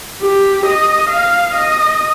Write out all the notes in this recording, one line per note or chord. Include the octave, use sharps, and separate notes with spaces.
G4
D#5
F5
D#5